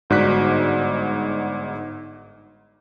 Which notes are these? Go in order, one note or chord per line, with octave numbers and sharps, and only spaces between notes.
G1 G#2 F#4 D5 F#6 B6